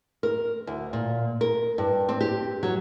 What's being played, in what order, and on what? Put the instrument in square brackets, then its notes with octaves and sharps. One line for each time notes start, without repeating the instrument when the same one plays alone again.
[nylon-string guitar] A#4
D2
A#2
A#4
G2
C4
G4
F#3